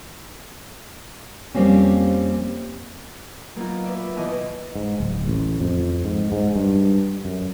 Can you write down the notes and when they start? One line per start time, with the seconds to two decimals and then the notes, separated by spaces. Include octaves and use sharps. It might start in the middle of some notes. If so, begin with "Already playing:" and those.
1.54 F2 G3 A#3 C4 C#4
3.56 F#3 A#3 B3 D#4 F4
3.84 B4 D5 E5
4.16 D#2 B2 D#3 E3 D#5 D6
4.75 G#2
5.00 D1
5.27 A1
5.61 F2
6.05 G#2
6.32 G#2
6.55 G2
7.25 F#2